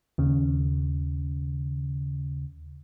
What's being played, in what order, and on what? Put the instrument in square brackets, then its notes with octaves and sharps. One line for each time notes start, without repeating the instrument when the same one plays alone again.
[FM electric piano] D#2 C#3